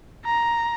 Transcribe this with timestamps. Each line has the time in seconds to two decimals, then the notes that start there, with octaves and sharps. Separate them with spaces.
0.25 A#5